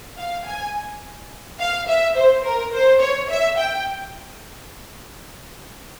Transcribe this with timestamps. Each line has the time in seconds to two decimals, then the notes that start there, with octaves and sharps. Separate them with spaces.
0.18 F5
0.45 G#5
1.59 F5
1.87 E5
2.16 C5
2.44 A#4
2.72 C5
3.00 C#5
3.29 E5
3.58 G5